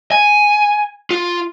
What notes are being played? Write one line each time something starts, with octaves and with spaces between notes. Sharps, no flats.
G#5
F4